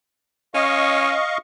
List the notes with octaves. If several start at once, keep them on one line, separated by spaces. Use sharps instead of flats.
C#4 D#5 F5 C#6